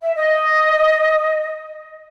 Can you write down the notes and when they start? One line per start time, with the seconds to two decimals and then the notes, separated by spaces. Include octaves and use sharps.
0.01 E5
0.15 D#5